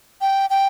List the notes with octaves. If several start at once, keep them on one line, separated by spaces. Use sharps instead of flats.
G5
G5